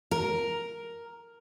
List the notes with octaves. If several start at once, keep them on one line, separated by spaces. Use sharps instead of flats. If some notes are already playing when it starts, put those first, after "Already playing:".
A#4